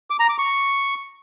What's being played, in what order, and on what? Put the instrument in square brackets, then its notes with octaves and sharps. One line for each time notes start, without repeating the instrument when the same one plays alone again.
[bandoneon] D6
A#5
D6
C#6